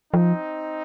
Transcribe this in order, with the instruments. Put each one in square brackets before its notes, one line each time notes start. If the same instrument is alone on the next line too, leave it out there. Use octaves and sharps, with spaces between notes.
[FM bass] F3 [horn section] C4 D#4